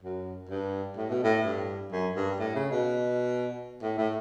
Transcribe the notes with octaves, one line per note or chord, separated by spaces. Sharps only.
F#2
G2
A2
B2
A2
G2
F#2
G2
A2
C#3
B2
A2
A2